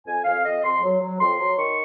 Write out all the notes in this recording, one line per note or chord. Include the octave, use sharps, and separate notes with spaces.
F2 G#5
F2 F5
F2 D#5
F2 C6
F#3
F#3
F2 C6
F#3
D#3 C#6